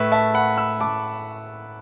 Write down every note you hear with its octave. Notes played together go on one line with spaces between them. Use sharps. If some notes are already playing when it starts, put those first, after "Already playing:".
Already playing: A2 A3 B4 E5
E5 A5
F#5 B5
B5 E6
A2 A3 A5 D6